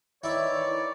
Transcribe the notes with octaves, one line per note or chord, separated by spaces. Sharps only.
D#3 E3 E4 C#5 D5